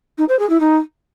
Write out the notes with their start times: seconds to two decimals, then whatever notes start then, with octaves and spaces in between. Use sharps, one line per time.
0.18 D#4
0.28 C5
0.39 G#4
0.49 E4
0.60 D#4